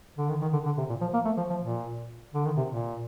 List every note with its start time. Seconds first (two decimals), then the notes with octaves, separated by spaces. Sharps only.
0.18 D3
0.29 D#3
0.42 D#3
0.53 D3
0.66 D3
0.78 C3
0.89 A#2
1.01 F3
1.14 A#3
1.25 A3
1.37 F3
1.50 F3
1.61 A#2
2.34 D3
2.46 D#3
2.57 C3
2.70 A#2